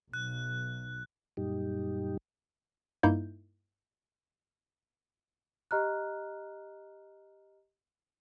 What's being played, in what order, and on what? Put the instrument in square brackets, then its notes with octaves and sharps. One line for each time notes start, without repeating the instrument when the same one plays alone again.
[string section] B1 [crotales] F#6
[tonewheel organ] F#2 A#2 G3 D#4 G4
[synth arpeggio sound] G2 A#3 D#4 E4 G6
[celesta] G4 D#5 A#5 F6 F#6